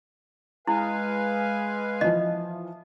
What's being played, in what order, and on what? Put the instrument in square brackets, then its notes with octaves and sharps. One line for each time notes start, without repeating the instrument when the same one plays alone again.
[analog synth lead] G#3 [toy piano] E4 [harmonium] B4 F5 G#5
[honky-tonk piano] E3 F3 [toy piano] D#5